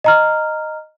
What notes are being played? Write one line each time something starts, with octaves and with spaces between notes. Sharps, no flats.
D#5 A#5 F6